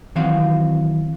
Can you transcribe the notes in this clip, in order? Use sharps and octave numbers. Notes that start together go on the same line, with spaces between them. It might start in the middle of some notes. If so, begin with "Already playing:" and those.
D#3 E3 F#3 C4 F#4 F5